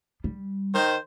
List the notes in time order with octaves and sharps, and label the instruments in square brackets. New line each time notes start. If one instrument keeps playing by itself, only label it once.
[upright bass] G3
[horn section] D#3 C5